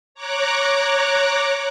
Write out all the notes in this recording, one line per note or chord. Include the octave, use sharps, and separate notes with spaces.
C#5 A#5 D6 F#6